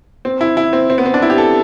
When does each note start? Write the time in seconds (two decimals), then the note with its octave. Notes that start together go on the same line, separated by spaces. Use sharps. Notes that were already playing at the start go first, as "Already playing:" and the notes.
0.25 C4
0.41 E4
0.57 E4
0.73 C4
0.90 C4
0.98 B3
1.05 C4
1.14 D4
1.22 E4
1.30 G4
1.38 A4